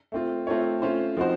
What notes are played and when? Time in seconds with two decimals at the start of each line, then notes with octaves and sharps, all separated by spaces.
0.12 A3 C4 F4
0.47 A3 C4 F4 A4 C#5
0.82 A3 C#4 F4 C5
1.17 F3 C4 D#4 F#4 C5